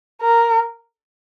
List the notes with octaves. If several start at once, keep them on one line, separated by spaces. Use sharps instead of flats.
A#4